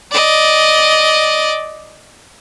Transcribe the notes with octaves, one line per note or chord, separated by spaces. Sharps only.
D5 D#5